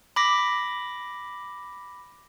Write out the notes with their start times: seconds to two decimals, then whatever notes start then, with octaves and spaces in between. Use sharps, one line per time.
0.16 B5 D6 A#6 B6